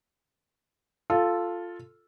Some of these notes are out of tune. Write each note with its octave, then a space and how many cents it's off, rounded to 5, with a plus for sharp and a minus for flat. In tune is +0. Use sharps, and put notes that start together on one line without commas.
F4 +0 A4 +0